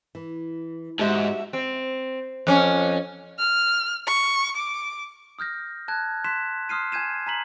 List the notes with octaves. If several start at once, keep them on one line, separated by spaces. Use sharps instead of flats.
E3
G#2 G#3 F#4 G4 E5 A5
C4
F2 C#4
F6
C#6
D6
D#6 F6 G6 A#6
A5 F#6 G#6
C6 F#6 B6 E7
C6 D#6 F6 C7 D#7
G#5 G6 G#6 D#7 E7
G#5 A#5 B6 F#7